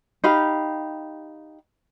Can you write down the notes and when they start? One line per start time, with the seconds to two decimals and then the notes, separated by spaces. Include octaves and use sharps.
0.24 D#4 G4 F5 B5